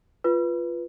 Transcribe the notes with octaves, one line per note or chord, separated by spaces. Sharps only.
F4 B4